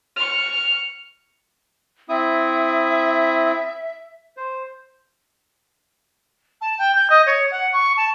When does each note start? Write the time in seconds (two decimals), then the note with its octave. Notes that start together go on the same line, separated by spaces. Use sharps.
0.16 C#6 F6
2.09 C4 E4 E5 D#6
4.37 C5
6.61 A5
6.78 G5
6.95 G6
7.10 D#5
7.26 C#5
7.51 F#5
7.72 C#6
7.97 A5